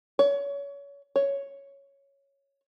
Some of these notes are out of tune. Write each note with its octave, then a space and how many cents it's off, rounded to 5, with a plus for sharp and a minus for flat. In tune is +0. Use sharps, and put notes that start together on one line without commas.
C#5 +30
C#5 +0